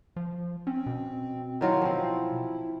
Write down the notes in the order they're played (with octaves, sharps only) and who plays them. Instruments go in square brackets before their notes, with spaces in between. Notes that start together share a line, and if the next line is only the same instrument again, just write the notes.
[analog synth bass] F3
[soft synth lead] C4 [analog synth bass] C#4
[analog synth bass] B2
[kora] D#3 F#3 F4 [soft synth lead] E4
[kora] F3 C4